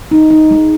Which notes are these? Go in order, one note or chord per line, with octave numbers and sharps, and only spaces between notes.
D#4
D#4
G#3